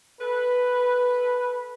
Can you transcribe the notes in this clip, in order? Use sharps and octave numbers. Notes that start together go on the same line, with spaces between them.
A4 B4